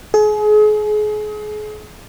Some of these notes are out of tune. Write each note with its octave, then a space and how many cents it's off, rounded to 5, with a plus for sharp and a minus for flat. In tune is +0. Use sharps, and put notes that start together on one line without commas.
G#4 +35